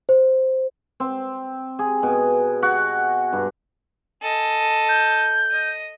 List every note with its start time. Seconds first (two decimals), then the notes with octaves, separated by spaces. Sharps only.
0.09 C5
1.00 C4
1.79 G#4
2.03 B2
2.63 F#4
3.32 G2
4.22 A4 D#5 G#5
4.89 G6
5.51 D#5